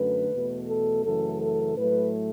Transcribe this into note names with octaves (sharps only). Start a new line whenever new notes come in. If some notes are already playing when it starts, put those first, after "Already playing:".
Already playing: F#2 D3 A3 B4
E2 B2 A3
A4
F#2 C#3 E3 A3 A4
A4
A2 F#3 A3 B4